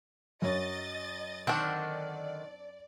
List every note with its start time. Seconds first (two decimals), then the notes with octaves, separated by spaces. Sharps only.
0.42 F#2 F#3 D#5 A6
1.47 D3 D#3 C4 D4 D5 F#5